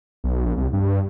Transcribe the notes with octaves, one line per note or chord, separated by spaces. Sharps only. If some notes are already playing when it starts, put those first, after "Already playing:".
B1
A#1
C2
G2